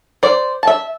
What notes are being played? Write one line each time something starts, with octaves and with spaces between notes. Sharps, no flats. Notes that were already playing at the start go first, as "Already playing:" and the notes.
C5 D5
E5 A5